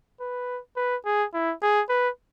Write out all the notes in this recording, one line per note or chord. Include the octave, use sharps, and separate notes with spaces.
B4
B4
G#4
E4
G#4
B4